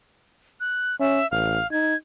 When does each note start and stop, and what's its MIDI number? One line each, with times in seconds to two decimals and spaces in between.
0.60 0.96 90
1.00 1.21 61
1.00 1.29 76
1.31 1.59 33
1.31 1.69 77
1.71 1.94 63
1.71 1.96 92